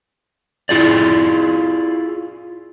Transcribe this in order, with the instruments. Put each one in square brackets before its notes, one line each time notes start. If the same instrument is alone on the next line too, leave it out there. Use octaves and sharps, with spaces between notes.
[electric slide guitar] E4 F4 G#4 D5